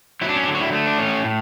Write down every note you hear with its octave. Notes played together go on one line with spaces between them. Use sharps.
F#3 E4
D4
C#4
D4
D3
F#4
E4
A3
D4
A2 C#4
A2